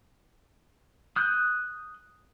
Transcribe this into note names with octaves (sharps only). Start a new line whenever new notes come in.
D#6 F#6 G6